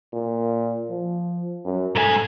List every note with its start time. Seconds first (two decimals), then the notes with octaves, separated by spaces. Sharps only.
0.13 A#2
0.90 F3
1.65 F#2
1.95 G#2 A4 G#5